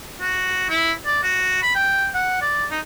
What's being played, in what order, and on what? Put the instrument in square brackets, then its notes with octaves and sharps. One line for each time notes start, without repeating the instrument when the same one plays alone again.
[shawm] F#4
E4
D5
F#4
B5
G5
F#5
D5
D#4